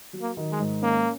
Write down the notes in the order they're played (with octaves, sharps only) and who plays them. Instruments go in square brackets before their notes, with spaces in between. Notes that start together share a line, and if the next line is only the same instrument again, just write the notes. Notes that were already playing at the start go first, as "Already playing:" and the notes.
[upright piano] F#3
[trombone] A#3
[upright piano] D#3
[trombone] G#3
[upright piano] G#2
[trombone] A#3 [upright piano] C#4